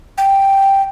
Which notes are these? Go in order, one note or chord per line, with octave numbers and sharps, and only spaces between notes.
G5